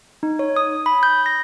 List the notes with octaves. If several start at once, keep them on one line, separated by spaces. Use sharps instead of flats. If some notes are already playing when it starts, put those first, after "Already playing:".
D#4
C#5
D#6
B5
G6
A#6